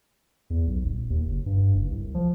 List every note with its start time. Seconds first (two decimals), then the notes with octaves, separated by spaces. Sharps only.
0.50 E2
0.67 B1
0.84 D#1
1.10 D#2
1.26 F#1
1.46 G2
1.75 F#1
1.91 C2
2.14 F3